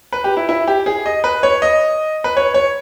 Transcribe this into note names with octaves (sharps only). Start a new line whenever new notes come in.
B4
G4
E4
E4
G4
G#4
D#5
B4
C#5
D#5
B4
C#5
C#5